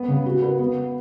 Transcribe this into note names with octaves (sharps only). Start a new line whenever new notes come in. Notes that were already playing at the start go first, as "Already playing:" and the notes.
Already playing: B3 B4
C#3
F#4
B4
B3